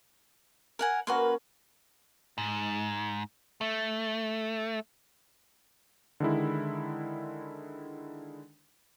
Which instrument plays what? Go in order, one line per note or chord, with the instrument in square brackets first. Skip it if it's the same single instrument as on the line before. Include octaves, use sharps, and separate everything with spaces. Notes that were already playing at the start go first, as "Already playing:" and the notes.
[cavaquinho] A#4 F#5 G#5
[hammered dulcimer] A#3 C#4 [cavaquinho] F#4 B4 C6
[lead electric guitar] G#2
A3
[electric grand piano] D3 D#3 G#3 E4